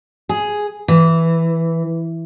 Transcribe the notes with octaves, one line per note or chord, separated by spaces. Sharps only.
G#4
E3